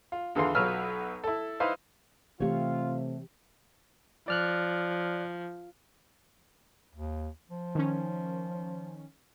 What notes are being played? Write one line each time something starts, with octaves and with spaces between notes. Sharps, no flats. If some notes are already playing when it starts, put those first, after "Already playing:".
F4
E2 D3 E3 F4 C6
B1 F#3 F4 B4 E6 F6
E4 A4
D#4 E4 B4 C5 F5
C3 E3 A3 F4 G4 C#5 F5
F3 D5 F6 F#6
D#2
F3
D#3 C#4